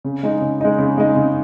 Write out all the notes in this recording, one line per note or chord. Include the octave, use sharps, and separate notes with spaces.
C#3
G#3 D#4
C#3
G#3 D#4
C#3
G#3 D#4
C#3